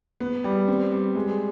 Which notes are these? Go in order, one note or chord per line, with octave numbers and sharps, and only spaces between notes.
B3
G3
C4
G3
G#3